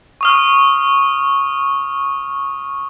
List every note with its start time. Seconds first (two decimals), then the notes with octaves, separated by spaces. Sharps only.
0.21 C#6 D#6 F6